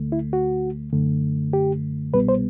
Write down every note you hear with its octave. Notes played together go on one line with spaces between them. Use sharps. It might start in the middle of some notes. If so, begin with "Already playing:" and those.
Already playing: D2 D3 A3
E4
F#4
F#2 D3 A3
G4
C2 B2 G3 B3 B4
C5